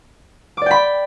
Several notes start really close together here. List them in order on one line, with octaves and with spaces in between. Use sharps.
D6 D5 G5 B5